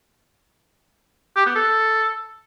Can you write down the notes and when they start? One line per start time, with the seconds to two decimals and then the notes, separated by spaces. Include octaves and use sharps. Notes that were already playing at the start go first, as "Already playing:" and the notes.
1.36 G4
1.46 B3
1.55 A4